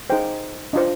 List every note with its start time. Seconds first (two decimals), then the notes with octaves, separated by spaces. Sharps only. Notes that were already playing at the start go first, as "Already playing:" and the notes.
0.10 D#4 G#4 C5 G5
0.73 D4 F4 C5 D#5